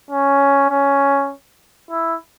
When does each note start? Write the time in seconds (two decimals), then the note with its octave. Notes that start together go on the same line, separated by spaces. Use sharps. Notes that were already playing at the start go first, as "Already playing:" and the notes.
0.10 C#4
0.69 C#4
1.90 E4